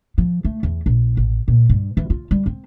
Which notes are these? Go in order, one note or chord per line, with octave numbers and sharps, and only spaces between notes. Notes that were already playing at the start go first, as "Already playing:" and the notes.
F3
A3
E2
A#1
A1
A#2
G2
E3
F4
G3
C4